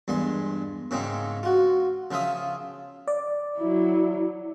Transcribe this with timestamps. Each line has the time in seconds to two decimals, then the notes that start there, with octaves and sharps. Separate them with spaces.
0.08 E2 G2 G#3 C6
0.91 G#2 C#3 G#3 C4 D#4
1.43 F4 F#4
2.11 C#3 F3 F4 E5 D#6
3.08 D5
3.58 F#3 E4